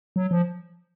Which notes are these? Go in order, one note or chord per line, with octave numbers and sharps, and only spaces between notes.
F#3
F3